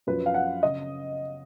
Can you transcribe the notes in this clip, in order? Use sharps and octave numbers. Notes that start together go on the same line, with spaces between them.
F#2 F3 B4
F5
F#5
C#3 D#5